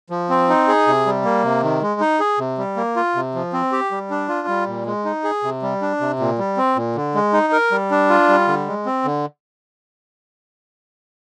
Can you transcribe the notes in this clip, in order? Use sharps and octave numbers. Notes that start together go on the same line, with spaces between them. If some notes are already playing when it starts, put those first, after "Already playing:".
F3
C4
D#4
G#4
C3
G3
A#3
C3
D#3
G#3
D#4
G#4
C3
G3
A#3
F4
C3
F3
C4
G4
G3
D4
F4
G3
A#2
G#3
D#4
G#4
C3
G3
D4
C3
A#2
G3
C4
A#2
D3
G#3
D#4
A#4
G3
D4
F4
G3
D3
G#3
C4
D3